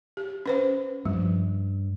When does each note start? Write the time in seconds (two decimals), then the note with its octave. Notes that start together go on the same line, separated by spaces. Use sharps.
0.17 G4
0.46 C#4 B4 C5
1.05 G2 F3